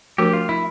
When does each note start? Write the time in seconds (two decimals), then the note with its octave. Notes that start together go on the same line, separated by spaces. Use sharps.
0.18 F3 A3 D4 F#4 G4 A#4
0.33 F4
0.49 E4